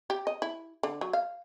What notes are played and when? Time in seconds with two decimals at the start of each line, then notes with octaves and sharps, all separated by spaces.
0.10 G4
0.27 D#5
0.42 E4
0.83 D3
1.01 F#3
1.13 F5